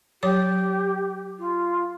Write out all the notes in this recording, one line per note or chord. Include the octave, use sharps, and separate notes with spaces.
F#3 G4 C#5 D6
F4